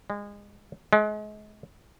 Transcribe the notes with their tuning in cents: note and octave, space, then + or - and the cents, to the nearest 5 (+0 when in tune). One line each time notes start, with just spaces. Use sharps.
G#3 -25
G#3 +35